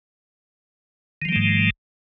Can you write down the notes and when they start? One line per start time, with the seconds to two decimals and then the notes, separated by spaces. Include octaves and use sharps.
1.22 D#3
1.25 F3
1.29 G3
1.32 A3
1.36 G#2